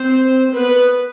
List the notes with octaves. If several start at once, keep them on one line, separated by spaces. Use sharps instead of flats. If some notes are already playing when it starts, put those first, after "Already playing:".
Already playing: C4 C5
B3 B4